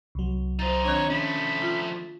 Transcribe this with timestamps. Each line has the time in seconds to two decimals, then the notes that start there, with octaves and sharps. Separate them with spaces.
0.15 C2 F#3
0.59 D#4 F4 C5 A6
0.84 D#3 C4 D4 C#5
1.10 F3 A3 C#4 B5
1.62 F4